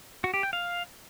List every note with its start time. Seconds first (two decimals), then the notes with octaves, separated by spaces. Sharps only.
0.24 F#4
0.34 G4
0.43 G5
0.53 F5